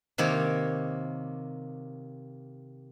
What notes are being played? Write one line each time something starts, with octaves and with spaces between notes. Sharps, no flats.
C3 D#3 A#3 C#5